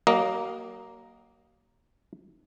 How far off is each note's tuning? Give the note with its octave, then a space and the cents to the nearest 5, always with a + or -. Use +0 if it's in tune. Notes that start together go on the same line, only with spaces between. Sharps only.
F#3 +40 A#3 +0 D#5 +0